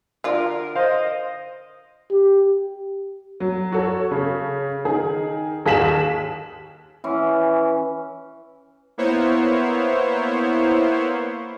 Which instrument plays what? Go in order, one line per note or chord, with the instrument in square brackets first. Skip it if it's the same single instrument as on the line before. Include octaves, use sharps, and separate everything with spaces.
[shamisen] D3 F4 [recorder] A#4
[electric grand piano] C5 F5 [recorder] D#5
[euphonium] G4
[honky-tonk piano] F#3
F#4 A4 C#5
C#3
D#3 G#4
D#2 G#4 F5 B6 E7 F#7
[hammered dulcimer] E3 C#4
[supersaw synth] A#3 B3 E4 C5 C#5